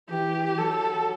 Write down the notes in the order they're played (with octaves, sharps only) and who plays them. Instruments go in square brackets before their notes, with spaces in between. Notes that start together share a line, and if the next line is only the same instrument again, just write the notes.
[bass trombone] E3 [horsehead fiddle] G4
[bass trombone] F#3 [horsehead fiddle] A4